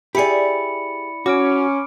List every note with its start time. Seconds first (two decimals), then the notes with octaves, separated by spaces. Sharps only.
0.15 E4 G4 G#4 D5 B5 C#7
1.26 C#4 F#4 D6 F6 D7